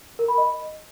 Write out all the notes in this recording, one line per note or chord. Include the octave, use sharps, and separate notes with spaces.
A#4
B5
D#5